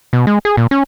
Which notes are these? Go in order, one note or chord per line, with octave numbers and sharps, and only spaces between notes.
B2
G#3
G#4
A#2
C#4